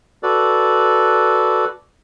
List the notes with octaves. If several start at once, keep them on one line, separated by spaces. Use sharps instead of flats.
F#4 A4 B4 D5